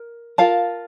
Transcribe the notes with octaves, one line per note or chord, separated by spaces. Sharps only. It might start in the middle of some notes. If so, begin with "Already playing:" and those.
Already playing: A#4
F4 A#4 F5 A5